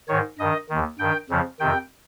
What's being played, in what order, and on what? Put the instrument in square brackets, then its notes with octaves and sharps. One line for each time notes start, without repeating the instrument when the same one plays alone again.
[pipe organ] G#2 D#3 C#5
G2 D#3 D#5
D#2 D#3
G2 D#3 G5
F2 C#3 F3
F2 C3 D#3 G5